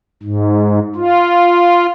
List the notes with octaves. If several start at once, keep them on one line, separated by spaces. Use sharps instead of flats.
G#2
F4